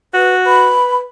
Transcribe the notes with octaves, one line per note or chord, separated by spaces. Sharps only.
F#4 B4
B4 B5